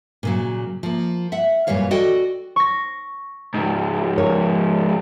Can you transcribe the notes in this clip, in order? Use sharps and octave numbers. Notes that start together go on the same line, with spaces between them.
A#2 C#3 F#3
F3 A#3
E5 F#5
F#2 A#2 E3 G3 C#5 F5
F#4 A4 D5 D#5 G5
C#6 A#6
C#2 G#2
A#4 C#5